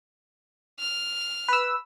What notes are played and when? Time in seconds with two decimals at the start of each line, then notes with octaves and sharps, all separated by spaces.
0.79 F6
1.48 B4 E6